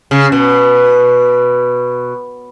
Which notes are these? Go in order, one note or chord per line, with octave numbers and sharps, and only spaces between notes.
C#3
B2